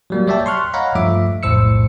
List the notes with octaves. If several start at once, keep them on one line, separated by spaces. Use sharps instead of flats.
F#3 G3 A#3
C#5 D5 E5 G5 A5
C6 C#6 F6 F#6
C#5 D#5 F5 F#5 A#5 B5
G2 F3 A3 E5 D6
B1 F2 A2 C5 E6 C#7